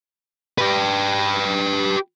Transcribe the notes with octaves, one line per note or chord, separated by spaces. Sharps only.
G4 B4